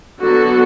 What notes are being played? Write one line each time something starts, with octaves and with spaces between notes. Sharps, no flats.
D3 F#3 B3 F#4 A4